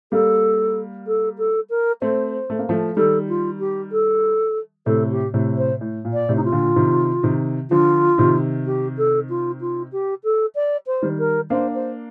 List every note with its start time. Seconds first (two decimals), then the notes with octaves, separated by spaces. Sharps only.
0.12 G3 A#3 A4
1.07 A4
1.38 A4
1.70 A#4
2.02 A3 C4 C5
2.50 A3
2.59 A#3
2.69 F3 A3
2.96 D#3 G3 A4
3.28 F4
3.59 G4
3.92 A4
4.86 A2 C3 A4
5.11 G4
5.34 A2 C3
5.58 C5
5.81 A2
6.05 A#2
6.13 D5
6.29 A2 C3
6.36 D#4
6.44 F4
6.52 A#2 D3
6.76 C3 D#3
7.23 C3 D#3
7.70 D3 F3 F4
8.18 C3 D#3
8.66 G4
8.97 A4
9.29 F4
9.61 F4
9.92 G4
10.24 A4
10.55 D5
10.87 C5
11.02 D#3 G3
11.19 A#4
11.50 A#3 D4 C5
11.75 C5